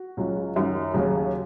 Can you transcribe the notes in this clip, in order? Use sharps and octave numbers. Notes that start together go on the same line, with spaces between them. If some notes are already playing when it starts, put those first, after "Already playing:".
Already playing: F#4
C#2 C#3 F#3
F#2 D#3 F#3
D#2 C#3 F#3